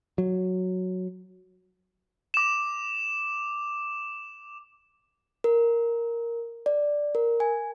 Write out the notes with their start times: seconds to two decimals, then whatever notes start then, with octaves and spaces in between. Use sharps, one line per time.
0.18 F#3
2.34 D6 E7
5.44 A#4
6.66 D5
7.15 A#4
7.40 G#5